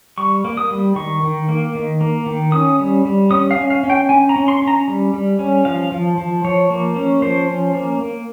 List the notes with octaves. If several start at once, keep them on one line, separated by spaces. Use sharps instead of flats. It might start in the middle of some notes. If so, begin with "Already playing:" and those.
G3 C#6
A#3
D#6
G3
D#3 C#6
D#3
A#3
D#3
A#3
D#3
C#4 D#6
G3
G3
C#4 D#6
F5
C#4
F5
C#4
G5
C#4 G#5
A#5
C#4
C6
C#4
A#5
G3
G3
C#4
F3 F5
F3
F3
F3 C#5
A#3
C#4
F3 C5
C#4
A#3
A#3